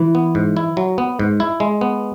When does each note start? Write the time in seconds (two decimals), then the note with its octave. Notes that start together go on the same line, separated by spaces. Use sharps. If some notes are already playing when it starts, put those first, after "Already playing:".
Already playing: E3
0.15 B3
0.35 G#2
0.57 E4
0.77 F#3
0.98 B3
1.19 G#2
1.40 E4
1.60 G#3
1.81 B3